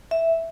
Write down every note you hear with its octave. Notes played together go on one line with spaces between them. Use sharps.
E5